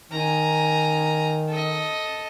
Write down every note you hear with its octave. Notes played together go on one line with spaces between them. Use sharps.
D#3 G#5 A#5
A4 D#5